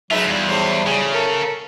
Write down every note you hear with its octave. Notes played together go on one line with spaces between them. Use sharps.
F#3 G#3 A3 D#4 F4 B4 E5
E2 G3 F4
A2 F#3 C5
C#3 G#4
A4 A#4